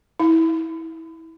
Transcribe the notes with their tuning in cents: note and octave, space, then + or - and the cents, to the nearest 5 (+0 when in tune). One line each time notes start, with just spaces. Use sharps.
E4 -20